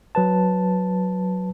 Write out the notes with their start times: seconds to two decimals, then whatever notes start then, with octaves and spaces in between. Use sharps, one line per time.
0.15 F#3 B4 A5